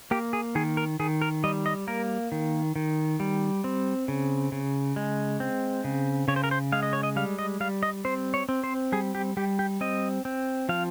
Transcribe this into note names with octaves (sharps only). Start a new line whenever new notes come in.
A#3 G4
G#4
D#3 G#4
A#4
D#3 G#4
A#4
G3 D#5
D#5
A#3 A#4
D#3
D#3
G3
C4
C#3
C#3
G#3
C4
C#3
C#3 C#5
C5
A#4
C5
G#3 F5
D#5
C#5
D#5
G3 F5
D#5
G3 F5
D#5
C4 C5
C#5
C4
C5
G3 G#4
G4
G3 G4
G4
C4 D#5
C4
F3 F5